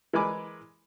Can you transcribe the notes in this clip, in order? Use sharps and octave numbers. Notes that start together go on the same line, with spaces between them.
E3 G#3 A#4 B4 G#5 D6